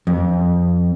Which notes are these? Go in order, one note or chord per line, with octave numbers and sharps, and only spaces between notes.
F2